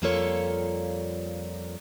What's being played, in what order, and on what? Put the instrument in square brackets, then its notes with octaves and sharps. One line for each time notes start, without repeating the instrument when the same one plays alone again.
[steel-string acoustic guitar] F2 G3 A#3 F4 A4 C#5